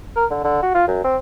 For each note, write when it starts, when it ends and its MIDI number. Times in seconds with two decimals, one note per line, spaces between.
0.16 0.25 70
0.31 0.39 50
0.44 0.60 50
0.63 0.72 66
0.75 0.84 65
0.88 1.02 42
1.04 1.17 60